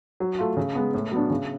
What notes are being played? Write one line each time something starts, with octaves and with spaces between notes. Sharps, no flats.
F#3
A3 F4
C#3
G#3 B3
A2
F#3 B3 D4
C#3